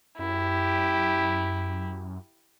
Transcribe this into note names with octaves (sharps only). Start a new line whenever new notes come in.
F#2 E4 G4